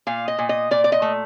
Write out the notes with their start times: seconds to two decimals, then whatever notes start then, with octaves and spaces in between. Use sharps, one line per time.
0.07 A#2 F5
0.28 D#5
0.38 A#2
0.49 D#5
0.71 A#2 D5
0.84 D5
0.92 D#5
1.02 A3